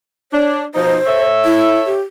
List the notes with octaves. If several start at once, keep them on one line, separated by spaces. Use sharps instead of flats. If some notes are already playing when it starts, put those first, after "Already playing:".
D4 C#5
B2 F3 D#4 C5
A4 C#5 E5
E4
G4